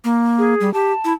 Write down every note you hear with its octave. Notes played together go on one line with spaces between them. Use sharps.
A#3
G#4
G3
G4 A5
E4